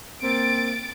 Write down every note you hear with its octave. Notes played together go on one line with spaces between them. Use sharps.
A#3 C4 A6 D7